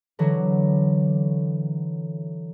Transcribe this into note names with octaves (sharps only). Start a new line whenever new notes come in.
D3 E3 F#3